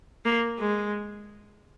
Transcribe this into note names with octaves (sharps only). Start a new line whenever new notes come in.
A#3
G#3